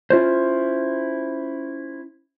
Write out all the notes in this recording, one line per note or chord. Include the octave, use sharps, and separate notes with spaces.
C#4 E4 F4 C5